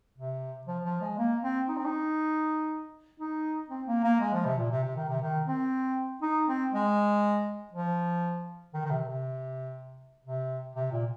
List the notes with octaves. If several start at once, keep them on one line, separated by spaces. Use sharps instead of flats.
C3
F3
F3
G#3
A#3
C4
D#4
C4
D#4
D#4
C4
A#3
A#3
G#3
F3
C3
A#2
C3
C3
D#3
C3
D#3
C4
D#4
C4
G#3
F3
D#3
D#3
C3
C3
C3
C3
A#2